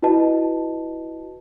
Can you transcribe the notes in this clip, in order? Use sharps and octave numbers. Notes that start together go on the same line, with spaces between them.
E4 F#4 B4 D#5 A5